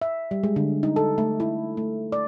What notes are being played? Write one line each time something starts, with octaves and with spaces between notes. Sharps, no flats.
E5
G3
G#3
D3
D#4
A4
A3
E4
A3
D5